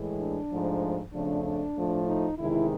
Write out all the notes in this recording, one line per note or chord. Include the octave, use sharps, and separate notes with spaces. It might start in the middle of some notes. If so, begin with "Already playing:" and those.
Already playing: A2 E3 G#3
D4
G#2 F3 A3
F2 C#3 F3 A3 D4
D4
A2 F3 A3
D#4
E2 C3 D#3 G#3 E4